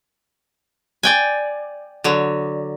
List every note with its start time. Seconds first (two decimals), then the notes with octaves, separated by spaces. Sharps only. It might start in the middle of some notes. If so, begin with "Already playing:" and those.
1.03 D5 G5 G#5
2.04 D3 F#3